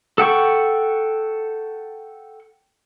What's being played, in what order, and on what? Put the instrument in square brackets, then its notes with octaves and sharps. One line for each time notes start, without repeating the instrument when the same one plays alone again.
[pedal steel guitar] A4 F#5 G5 C#6